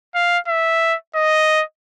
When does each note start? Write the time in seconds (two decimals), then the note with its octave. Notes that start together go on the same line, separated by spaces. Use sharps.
0.15 F5
0.48 E5
1.16 D#5